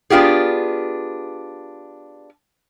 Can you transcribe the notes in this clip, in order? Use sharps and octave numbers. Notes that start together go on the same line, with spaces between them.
B3 D4 F4 G4 G#4